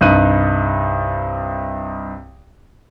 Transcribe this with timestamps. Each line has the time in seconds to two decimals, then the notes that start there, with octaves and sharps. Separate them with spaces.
0.01 C2 G2 D#4 F#6 D#7